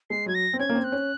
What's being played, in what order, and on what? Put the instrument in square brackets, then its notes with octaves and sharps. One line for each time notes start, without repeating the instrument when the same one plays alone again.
[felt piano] G#3 [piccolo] C7
[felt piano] F#3 [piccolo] G#6
[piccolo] A#6
[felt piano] C4
[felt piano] C#4 [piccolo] G#6
[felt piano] A#3
C4
[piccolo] F#6
[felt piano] C#4